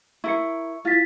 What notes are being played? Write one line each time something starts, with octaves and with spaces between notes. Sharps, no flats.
E4 A#4 C#6 C#7
E4 F4 A6 B6